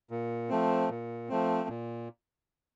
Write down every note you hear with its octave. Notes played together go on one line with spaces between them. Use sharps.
A#2
F3 A3 C4
A#2
F3 A3 C4
A#2